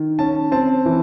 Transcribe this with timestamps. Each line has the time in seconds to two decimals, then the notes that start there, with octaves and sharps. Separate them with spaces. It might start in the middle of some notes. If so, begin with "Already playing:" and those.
Already playing: D#3
0.19 C#4 A5
0.52 C4 A5
0.86 E3